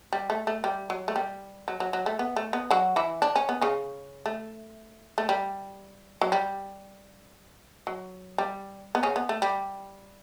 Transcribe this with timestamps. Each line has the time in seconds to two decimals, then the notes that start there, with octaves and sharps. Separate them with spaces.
0.13 G3
0.30 A3
0.47 A3
0.64 G3
0.90 F#3
1.08 A3
1.16 G3
1.68 F#3
1.80 F#3
1.93 F#3
2.06 A3
2.19 B3
2.36 A3
2.53 B3
2.71 F#3 F#4
2.96 E3 E4
3.22 D4
3.36 C#4
3.49 B3
3.61 C#3 C#4
4.26 A3
5.18 A3
5.29 G3
6.21 F#3
6.32 G3
7.87 F#3
8.38 G3
8.95 B3
9.03 C#3 C#4
9.16 B3
9.29 A3
9.42 G3